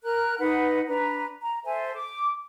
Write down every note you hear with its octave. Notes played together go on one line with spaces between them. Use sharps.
A#4 A#5 F#6
D#4 B4 F#5 B5
D4 B4 A#5
A#5
A4 C5 E5 G#5
D6